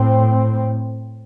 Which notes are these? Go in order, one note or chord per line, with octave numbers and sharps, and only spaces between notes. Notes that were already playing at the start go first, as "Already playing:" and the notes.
Already playing: A2 C4